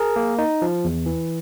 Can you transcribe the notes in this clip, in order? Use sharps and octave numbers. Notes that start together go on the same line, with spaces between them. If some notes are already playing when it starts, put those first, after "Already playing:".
Already playing: G#4 A#4
A#3
D#4
F3
E2
E3